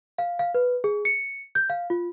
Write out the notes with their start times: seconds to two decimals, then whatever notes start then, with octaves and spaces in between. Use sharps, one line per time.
0.18 F5
0.39 F5
0.54 B4
0.84 G#4
1.05 C#7
1.55 G6
1.70 F5
1.90 F4